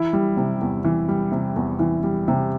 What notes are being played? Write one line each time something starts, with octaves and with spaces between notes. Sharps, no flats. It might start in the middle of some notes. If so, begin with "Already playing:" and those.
Already playing: E3 E4
G3
C3
E2
E3
G3
C3
E2
E3
G3
C3